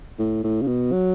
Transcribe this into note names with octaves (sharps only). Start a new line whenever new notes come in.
A2
A2
C#3
B2
F#3